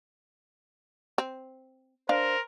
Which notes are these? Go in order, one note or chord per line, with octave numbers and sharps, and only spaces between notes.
C4
D4 A#4 C5 F5